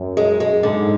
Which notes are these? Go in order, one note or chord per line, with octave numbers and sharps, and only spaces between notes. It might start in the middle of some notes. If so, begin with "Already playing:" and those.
Already playing: F#2
G#3
G#3
G#2 D3